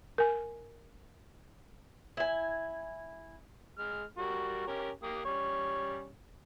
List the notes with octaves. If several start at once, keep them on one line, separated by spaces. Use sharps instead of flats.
A#4 G#5
E4 G#5
G#3 F6
G3 F#4 A#4
C#4 G4 A#4
A#3 G4 D#6
G3 C#4 C#5